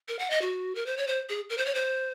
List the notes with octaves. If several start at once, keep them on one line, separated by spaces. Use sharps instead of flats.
A#4
F#5
D#5
F#4
A#4
C5
C#5
C5
G#4
A#4
C5
C#5
C5